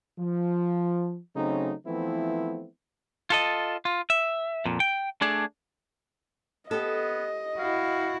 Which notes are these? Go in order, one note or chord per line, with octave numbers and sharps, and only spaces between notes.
F3
C#3 F#3 A3 C4 D#4
E3 F3 A3 B3 C4 E4
F4 A4 D#5
F4
E5
F2 A#2
G5
A3 D4 G#4 D5
B3 G4 A4 D#5
E4 F#4 F5